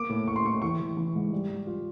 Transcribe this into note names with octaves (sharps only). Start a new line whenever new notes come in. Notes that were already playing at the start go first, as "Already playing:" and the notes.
Already playing: A#3 D6
A2
A2 C#6
C6
A2 C#6
E3 C#6
E3
E3
G#2
G3
G3
F4